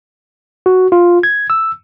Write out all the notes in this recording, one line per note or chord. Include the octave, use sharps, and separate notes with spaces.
F#4
F4
G#6
E6